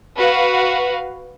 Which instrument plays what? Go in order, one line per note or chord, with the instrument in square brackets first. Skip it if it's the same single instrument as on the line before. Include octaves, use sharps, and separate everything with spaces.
[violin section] F#4 B4 F5